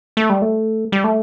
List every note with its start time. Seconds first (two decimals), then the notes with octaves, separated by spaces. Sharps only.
0.17 A3
0.30 G3
0.42 A3
0.92 G3
1.04 A3